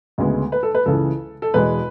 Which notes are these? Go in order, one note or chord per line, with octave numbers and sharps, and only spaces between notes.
D2 C#3 G#3 B3
B4
A4
B4
C#2 C#3 E3 A4
A4
E2 B2 G#3 B3 B4